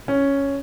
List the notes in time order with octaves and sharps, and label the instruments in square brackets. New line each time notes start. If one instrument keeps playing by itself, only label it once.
[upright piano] C#4